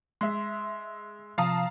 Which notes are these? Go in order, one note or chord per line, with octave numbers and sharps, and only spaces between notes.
G#3 E5 C6
C3 F3 F5 A5 A#5 D#6